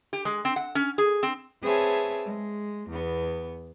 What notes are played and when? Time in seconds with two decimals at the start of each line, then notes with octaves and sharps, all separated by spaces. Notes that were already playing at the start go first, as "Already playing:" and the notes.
0.13 G4
0.25 G#3
0.45 C4
0.56 F#5
0.75 C#4
0.98 G#4
1.23 C4
1.63 C4 G#4 B4 C#5 E5 A5
2.26 G#3
2.89 E2 B3